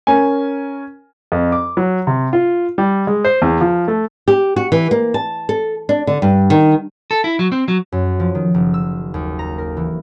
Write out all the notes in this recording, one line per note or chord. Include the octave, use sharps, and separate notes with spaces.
C#4 A#4 G#5
F2
D6
F#3
C3
F4
G3
G#3
C5
E2
F3
A3
G4
F#4
E3
A#3
A5
A4
D4
D3
G2
D#3
A4
E4
F#3
C4
F#3
F#2
F3
D#3
F#1
E6
D#2
A#5
A#4
E3